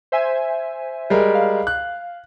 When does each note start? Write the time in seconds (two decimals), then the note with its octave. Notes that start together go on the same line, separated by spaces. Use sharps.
0.12 C5 E5 G#5
1.10 G3 G#3 A#4
1.35 F5
1.67 F#6